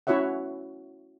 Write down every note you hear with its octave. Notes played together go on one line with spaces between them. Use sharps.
C#4 E4 F#4 C#5 E5 F#5